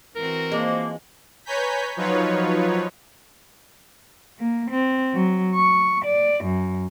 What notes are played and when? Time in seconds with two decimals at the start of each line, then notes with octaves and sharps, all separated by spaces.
0.16 E3 C4 F#4 A#4
0.52 F3 G#3 A#3
1.45 B4 C#5 G#5 A#5 G6 B6
1.97 F3 F#3 D#4 F4 B4 C#5
4.37 A#3
4.69 C4
5.14 F#3
5.54 C#6
6.04 D5
6.43 F#2